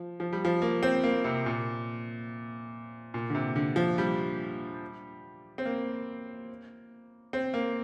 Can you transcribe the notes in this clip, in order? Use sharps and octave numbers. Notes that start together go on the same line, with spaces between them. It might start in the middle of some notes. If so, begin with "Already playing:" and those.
Already playing: F3
F3
G3
F3
A#3
C4
A#3
C3
A#2
A#2
D3
C3
D3
F3
G3
C4
A#3
C4
A#3